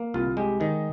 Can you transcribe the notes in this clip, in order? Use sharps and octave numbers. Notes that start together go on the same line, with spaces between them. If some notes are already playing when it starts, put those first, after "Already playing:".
Already playing: A#3
C2 F4
G#3 G4
D#3 D#4